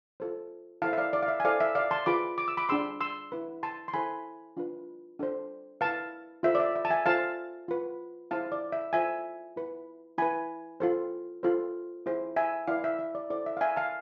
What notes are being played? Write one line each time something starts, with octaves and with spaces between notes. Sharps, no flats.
F4 A4 C5
E4 A4 C5 F5 A5
E5
D5 F5
D5
F5
E5
G#5
E4 A4 C5 D5 F5
E5
D5 F5
A5 C6
F4 G#4 B4 B5 D6
D6
E6
B5 D6
D4 G#4 C5 C6 E6
C6 E6
E4 B4
A5 C6
C6
E4 A4 C5 G#5 B5
D4 F4 B4
D4 A4 C5
E4 B4 F5 A5
F4 A4 C5 E5
D5
E5
E5
A5
E5 G#5
F4 A4 C5 F5 A5
F4 B4
E4 G#4 C5 F5 A5
D5
E5
F4 A4 C5 E5 G#5
E4 B4
E4 B4 G#5 B5
F4 A4 C5
F4 A4 C5
E4 G#4 C5
E5 G#5
E4 B4 D5 F5
E5
E5
D5
E4 A4 C5 D5
E5
F5
E5 G#5
F5 A5